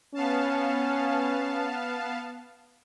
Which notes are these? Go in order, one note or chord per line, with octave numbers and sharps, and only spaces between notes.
B3 C#4 F5 A5